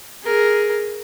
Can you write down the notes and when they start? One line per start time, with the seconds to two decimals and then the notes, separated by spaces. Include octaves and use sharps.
0.23 G#4 A#4